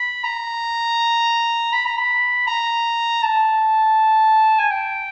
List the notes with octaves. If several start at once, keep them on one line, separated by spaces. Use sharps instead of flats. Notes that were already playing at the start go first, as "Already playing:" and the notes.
Already playing: B5
A#5
B5
A#5
B5
A#5
A5
G#5
G5